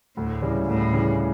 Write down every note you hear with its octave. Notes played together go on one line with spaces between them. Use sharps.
D2 A2
C#3 E3 G3
D2 A2
C#3 E3 G3